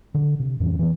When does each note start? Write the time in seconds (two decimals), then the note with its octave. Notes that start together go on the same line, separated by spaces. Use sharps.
0.14 D3
0.40 C3
0.60 F2 A2 E3 C#4
0.79 E3 B3